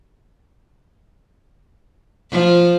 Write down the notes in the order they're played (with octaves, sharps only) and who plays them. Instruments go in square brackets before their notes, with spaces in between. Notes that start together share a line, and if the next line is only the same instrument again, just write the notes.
[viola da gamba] F3